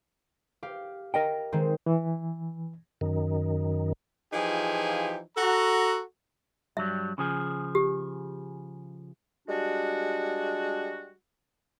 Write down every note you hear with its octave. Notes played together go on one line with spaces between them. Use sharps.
G4 F5
A#4 D#5 G5
D#3 G#3 C4
E3
F#2 D#3
E3 F3 D#4 F4 G4 G#4
F#4 A4 A#5
G2 F#3 G3 E5
C#3 F3 G#4
G4
G3 G#3 D4 F#4